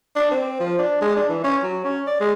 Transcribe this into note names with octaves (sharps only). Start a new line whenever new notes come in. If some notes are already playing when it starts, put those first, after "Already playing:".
D4
C4
F3
D4
G#3
D4
E3
C#4
F#3
C#4
D5
G#3